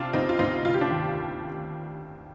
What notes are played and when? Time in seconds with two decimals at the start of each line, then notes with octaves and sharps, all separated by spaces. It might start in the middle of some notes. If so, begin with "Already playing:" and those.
Already playing: C3 D4 F4
0.13 D2 C4 D#4
0.29 F4
0.39 D2 C4 D#4
0.65 F1 F4
0.74 G4
0.81 D4 F4
0.91 D#2